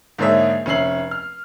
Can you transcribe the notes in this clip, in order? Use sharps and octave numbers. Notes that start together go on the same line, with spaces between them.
G#2 D3 A#3 G#4 C#5 E5
F1 C#4 E5 C7 F#7
F6